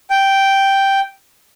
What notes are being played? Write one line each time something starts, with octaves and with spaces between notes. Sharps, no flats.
G5